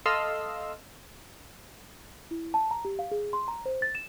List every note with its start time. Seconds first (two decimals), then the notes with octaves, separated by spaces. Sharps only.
0.06 A4 D#5 F5 C6 E6 F6
2.31 E4
2.54 A5
2.71 A#5
2.85 G4
2.99 F5
3.11 G#4
3.33 C6
3.48 A#5
3.66 C5
3.82 A6
3.95 E7